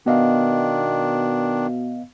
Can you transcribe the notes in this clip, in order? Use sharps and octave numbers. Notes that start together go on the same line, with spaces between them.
B2 D#3 B3 D4 D#5 F5